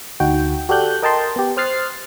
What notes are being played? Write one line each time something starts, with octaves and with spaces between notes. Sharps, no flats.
D2 D#4 F#4 G5
F#4 G4 A4 D5 F#6 G6
A#4 D#5 G5 A5 A#5 C6
B3 G4
C5 D#6 F6 F#6 A6 C7